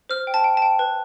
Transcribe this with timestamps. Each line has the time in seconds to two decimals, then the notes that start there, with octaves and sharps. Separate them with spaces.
0.09 C5 F6
0.27 G5
0.34 A5
0.44 G5
0.57 A5
0.62 G5
0.79 B4